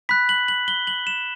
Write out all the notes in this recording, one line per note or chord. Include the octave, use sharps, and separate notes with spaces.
B5 F#6 B6
F#7
F#7
G7
F#7
E7